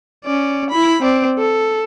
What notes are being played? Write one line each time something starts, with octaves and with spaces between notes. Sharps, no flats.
C#4 D5
E4 B5
C4 D5
A4